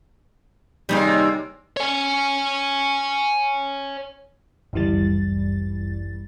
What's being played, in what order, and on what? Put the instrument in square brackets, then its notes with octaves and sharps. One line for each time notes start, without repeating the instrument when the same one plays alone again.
[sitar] D#2 C3 A#3 [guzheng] G3 D#4 G#4
[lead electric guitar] C#5 G#5
[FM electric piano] G1 C#2 F#2 E3 G3 A6